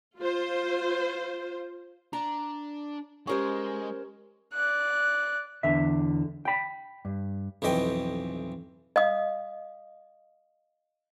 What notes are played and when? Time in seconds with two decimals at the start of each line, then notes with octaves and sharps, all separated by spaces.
0.19 F4 C5
2.13 D4 A#5
3.27 G#3 C#4 G4 A#4 C5 C#6
4.54 D5 F#6
5.63 E2 D3 E5
6.45 G5 B5
7.05 G2
7.62 B1 F2 E3 D#5 G5
8.96 D#5 F5 D#6